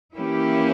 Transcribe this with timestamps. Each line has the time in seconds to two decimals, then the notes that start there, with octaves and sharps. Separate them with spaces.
0.15 E3 A#3 C#4 E4 G4